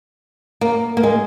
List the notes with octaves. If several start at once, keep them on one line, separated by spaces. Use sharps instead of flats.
A#3
A#3
G#3